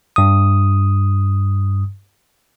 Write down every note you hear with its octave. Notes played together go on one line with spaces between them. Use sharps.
G2 D#6